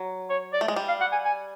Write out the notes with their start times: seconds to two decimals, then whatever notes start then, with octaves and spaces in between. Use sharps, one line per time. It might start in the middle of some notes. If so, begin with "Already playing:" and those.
Already playing: F#3
0.29 C#5
0.53 D5
0.61 A3
0.68 G#3
0.76 G3
0.88 F5
1.01 F#5
1.12 G#5
1.25 G#5